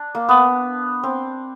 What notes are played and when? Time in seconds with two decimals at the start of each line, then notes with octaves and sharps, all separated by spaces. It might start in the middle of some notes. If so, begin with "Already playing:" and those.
Already playing: D4
0.15 A#3
0.29 B3
1.03 C4